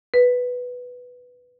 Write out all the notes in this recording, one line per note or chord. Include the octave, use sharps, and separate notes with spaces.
B4